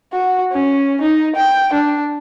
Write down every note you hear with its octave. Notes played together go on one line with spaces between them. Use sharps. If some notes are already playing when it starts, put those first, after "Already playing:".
F#4
C#4
D#4
G5
D4